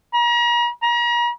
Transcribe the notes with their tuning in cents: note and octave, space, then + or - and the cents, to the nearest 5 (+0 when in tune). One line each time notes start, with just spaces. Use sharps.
A#5 +40
A#5 +40